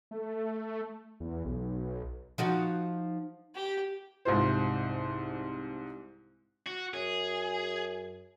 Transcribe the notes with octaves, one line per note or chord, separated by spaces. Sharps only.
A3
E2
B1
F3 D#4 F#4
G4
C2 G#2 C3 F4 C5
F#4
F#2 G#4